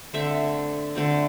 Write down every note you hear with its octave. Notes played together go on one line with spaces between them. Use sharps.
D3 A3 C4 E5
D3 A3 C4